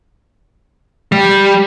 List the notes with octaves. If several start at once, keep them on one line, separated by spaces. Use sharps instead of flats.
G3